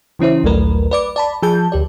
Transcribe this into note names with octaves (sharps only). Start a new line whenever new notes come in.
C#3 E3 C#4 E4 C5
A#1 D#2 F#3 A3 A#4 B4
B4 D5 D6
D5 A5 B5
F3 G#4 A5 G6
D2 G4 D5